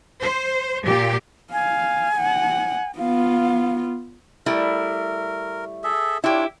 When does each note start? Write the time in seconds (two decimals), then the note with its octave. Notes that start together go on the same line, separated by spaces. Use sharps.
0.22 C5
0.85 A#2 G4
1.53 F5 G#5
2.17 F#5
2.98 B3 F4 F5
4.46 G3 A3 E4 A#4
5.84 G#4 A4 E5
6.24 D4 E4 F4 G4 C#5